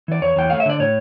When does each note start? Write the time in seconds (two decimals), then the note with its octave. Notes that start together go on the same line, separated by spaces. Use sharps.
0.08 E3 D5
0.22 E2 C#5
0.36 E2 G5
0.50 A3 F5
0.60 E5
0.65 D3 D5
0.80 A2 C#5